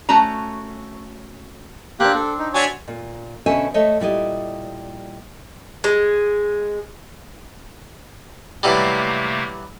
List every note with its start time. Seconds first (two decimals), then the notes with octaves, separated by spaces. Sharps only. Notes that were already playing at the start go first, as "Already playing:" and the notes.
0.09 A3 C#4 F#4 A5 A#5
2.00 A#3 C4 D4 G4 F#6
2.16 A4
2.39 D#4
2.54 D4 F#4 C#5 E5 G#5 A5
2.88 A#2
3.46 B2 D3 C#4 C5 E5 G#5
3.74 A3 C#5 D#5 E5
4.00 A#2 G3 E4 D#5
5.84 G#3
8.63 C3 E3 F#3 G3 A3 A#3